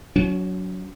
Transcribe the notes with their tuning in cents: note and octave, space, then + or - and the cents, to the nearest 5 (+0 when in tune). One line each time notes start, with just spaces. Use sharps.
F#3 +0 C#4 +45